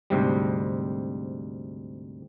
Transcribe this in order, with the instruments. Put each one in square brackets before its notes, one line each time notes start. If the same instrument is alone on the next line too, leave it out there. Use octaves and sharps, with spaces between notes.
[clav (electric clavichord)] D2 G#2 C3 G3